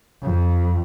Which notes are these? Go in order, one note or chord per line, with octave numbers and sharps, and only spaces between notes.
F2